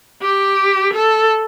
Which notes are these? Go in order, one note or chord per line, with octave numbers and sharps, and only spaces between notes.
G4
A4